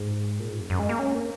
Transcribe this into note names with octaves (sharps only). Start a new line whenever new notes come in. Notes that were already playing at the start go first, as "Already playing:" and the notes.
Already playing: G#2
A#2
G#2
F#2
F#2
G#3
A#3
C#4
A#3